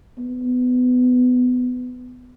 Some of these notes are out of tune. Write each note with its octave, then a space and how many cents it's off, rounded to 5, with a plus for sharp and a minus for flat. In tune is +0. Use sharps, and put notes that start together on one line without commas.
B3 +20